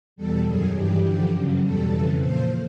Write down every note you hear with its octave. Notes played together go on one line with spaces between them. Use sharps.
E2 B2 G3 A4
F#2 D#3 F#3 G#4
G2 E3 G3 G4
G2 D3 F3 G4
F#2 C#3 F#3
E2 B2 G3 A4
F2 C#3 E3
A#2 F3 C5